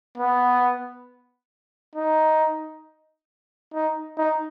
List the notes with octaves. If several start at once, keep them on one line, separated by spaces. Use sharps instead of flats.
B3
D#4
D#4
D#4